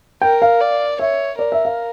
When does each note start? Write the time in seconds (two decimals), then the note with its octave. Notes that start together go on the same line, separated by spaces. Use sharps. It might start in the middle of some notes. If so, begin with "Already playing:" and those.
0.22 A#4 G5
0.42 F5
0.61 D5
0.99 C#5 E5
1.39 A#4 D5
1.52 E5
1.65 F5